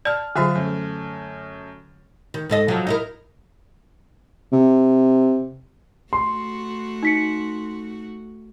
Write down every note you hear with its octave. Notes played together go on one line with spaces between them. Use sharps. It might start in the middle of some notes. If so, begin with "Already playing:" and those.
D5 A5 F6
D3 F#3 F4 G#4 E5
F#2 A3
D#3
G#2 A4 D#5
C3 F3 F#3
D#4 E4 A#4
C3
A3 F#4 C6
D#4 B6 C#7